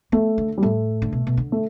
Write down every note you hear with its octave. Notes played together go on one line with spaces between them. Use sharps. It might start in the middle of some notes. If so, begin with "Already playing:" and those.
A3 B3
D3
G3
A2 A3
D3
B2
B2
D3
A3